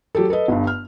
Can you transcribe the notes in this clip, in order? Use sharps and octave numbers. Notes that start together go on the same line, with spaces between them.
F#3 G4 A4
A4 B4 D#5
G1 G2
F6